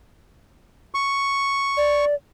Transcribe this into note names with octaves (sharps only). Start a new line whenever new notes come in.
C#6
D5